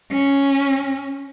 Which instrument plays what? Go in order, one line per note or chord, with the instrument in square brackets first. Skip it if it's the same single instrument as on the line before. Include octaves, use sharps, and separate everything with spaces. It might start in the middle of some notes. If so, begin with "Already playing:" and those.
[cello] C#4